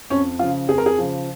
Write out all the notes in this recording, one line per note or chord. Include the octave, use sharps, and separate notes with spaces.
F2 C#4
C#3 F3 F4
F2 G#4
A#4
G#4
C#3 F3